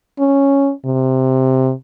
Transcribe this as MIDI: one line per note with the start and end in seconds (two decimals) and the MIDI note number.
0.19 0.71 61
0.85 1.72 48